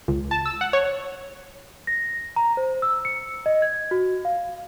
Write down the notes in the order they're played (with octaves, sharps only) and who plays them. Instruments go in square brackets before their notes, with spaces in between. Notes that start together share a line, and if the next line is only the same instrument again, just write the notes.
[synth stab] C#2
A5
E6
F#5
C#5
[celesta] A#6
A#5
C5
E6
C#7
D#5
G#6
F#4
F5